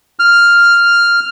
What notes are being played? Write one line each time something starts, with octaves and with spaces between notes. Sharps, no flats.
F6